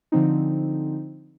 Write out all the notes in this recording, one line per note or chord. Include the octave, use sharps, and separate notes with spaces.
D3 F3 C4 D#4